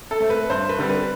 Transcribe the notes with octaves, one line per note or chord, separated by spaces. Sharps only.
A4
A3 C4
B4
G2 C5
B4
D3 G3 C4
B4